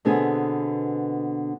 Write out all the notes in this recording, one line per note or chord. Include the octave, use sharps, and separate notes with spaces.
B2 D3 B3 C4 G#4